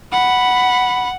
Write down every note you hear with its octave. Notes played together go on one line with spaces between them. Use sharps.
F#5 B5